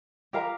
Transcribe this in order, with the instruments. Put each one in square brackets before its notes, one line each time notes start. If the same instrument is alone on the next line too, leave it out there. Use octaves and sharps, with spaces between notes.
[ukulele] G4 A#4 F5 A#5